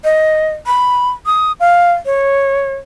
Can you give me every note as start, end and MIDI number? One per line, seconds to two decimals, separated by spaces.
0.04 0.48 75
0.66 1.09 83
1.26 1.52 87
1.60 1.93 77
2.06 2.75 73